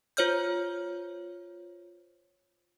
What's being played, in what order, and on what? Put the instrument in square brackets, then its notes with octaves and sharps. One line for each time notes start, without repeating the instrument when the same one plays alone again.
[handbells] F4 C5 C#5 F6 G6